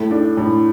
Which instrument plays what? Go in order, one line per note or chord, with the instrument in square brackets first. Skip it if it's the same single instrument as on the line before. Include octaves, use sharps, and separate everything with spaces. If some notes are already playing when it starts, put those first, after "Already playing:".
Already playing: [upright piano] A2 A3
D4
A2